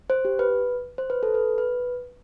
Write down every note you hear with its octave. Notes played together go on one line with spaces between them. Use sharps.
C5
G4
B4
C5
B4
A4
B4
B4